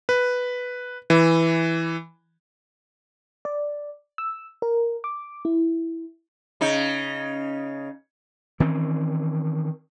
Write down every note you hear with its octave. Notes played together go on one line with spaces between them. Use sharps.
B4
E3
D5
E6
A#4
D6
E4
C#3 D#4
D#3 E3 C4 C#4